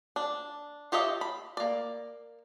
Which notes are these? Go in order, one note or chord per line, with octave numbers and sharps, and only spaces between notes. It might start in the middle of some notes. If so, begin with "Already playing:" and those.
D4
F4 G4 C#5 D#5 E5
B5
A#3 D5